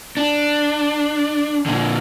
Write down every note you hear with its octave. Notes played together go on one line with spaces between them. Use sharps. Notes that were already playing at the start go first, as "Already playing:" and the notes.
D4
A#2 D3